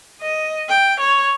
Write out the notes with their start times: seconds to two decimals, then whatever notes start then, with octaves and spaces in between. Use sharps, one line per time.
0.21 D#5
0.69 G5
1.00 C#5